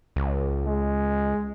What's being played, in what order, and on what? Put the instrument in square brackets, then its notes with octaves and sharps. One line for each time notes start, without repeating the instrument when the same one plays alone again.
[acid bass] C#2
[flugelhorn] G#3